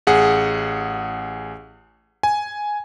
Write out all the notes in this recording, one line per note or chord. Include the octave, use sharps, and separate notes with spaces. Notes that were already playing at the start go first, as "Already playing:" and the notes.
A1 G#4 F#5
G#5